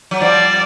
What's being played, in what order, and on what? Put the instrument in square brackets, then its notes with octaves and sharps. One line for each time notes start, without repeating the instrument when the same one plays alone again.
[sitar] F#3
[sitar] F3 G3 [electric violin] D5